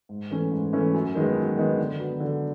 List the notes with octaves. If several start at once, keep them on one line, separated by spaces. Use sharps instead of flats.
G#2
E3 A3 C#4
G#2
E3 A3 C#4
F#2
D#3 G#3 B3
F#2
D#3 G#3 B3
D3
F#3 B3
D3